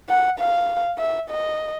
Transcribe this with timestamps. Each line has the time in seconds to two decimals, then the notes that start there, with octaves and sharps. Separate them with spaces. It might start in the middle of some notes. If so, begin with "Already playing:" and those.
0.09 F#5
0.39 F5
0.98 E5
1.29 D#5